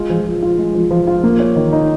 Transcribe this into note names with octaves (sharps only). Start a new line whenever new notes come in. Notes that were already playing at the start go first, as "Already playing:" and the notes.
Already playing: G#3 F4
F3
F3
F4
G#3
F3
F3
F4
A#3
C#5
D#3
D#4